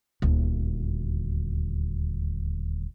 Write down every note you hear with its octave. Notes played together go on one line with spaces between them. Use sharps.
D#1 D2